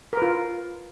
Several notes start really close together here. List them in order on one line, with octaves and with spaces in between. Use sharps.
A#4 B4 F4